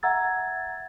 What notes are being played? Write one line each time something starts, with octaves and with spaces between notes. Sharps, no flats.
E5 F#5 A#5 E6 G#6 A6